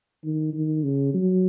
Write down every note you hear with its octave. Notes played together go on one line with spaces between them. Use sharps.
D#3
D#3
C#3
F#3